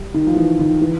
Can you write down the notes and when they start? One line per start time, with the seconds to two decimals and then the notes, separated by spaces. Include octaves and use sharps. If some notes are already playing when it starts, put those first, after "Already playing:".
Already playing: G3
0.14 D#3
0.27 F3
0.36 E3
0.59 D#3
0.81 E3